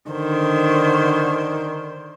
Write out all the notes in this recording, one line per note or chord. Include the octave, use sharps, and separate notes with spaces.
D3 D#3 C5